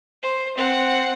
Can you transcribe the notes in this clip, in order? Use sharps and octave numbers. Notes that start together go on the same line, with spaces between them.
C5
C4 F#5